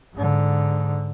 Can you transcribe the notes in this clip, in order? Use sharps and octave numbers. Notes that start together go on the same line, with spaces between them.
G#2 D3